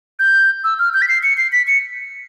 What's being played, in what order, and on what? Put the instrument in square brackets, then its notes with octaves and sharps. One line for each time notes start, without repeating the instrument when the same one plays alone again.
[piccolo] G6
E6
F6
G6
B6
C7
C#7
C7
B6
C#7